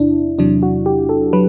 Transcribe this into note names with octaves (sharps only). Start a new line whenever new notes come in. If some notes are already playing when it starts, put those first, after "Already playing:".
Already playing: E2 C3 D4 E4
E2 C3 F#3 D4
F#4
G4
A4
F#3 B4